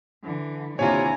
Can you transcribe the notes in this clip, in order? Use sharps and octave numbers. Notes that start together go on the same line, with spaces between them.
D3 E3
D#2 C3 D4 E4 F4 C#5 G#5 A#5